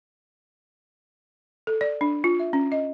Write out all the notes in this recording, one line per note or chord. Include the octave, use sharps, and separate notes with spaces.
A4
D5
D4
F4
E5
C#4
D#5